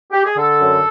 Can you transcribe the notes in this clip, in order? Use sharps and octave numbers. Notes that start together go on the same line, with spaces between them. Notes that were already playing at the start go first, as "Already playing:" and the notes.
G4
G#4
D3 A4
F#2